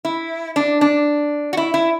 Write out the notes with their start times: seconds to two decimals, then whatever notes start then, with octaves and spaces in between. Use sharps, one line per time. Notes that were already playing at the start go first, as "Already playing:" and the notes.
0.05 E4
0.56 D4
0.81 D4
1.53 F#4
1.57 E4
1.74 E4